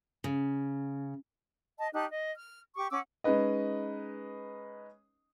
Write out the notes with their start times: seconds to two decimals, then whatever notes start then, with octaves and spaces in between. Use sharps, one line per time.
0.24 C#3
1.78 D#5 A5
1.93 D#4 G4 A5 F#6
2.11 D#5
2.36 F6
2.76 G4 C#6 D6
2.91 C#4 F#5 D6 E6
3.24 G#3 C#4 D#4 B4 D#5